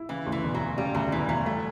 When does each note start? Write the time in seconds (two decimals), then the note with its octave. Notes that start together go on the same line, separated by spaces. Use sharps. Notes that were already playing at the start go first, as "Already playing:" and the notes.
Already playing: E4
0.09 C#3 E3
0.26 D2
0.32 E3
0.44 E1
0.54 F#3
0.61 E1
0.77 C#3 G3
0.94 D2 F#3
1.12 E1 E3
1.29 E1 F#3
1.46 G3 A3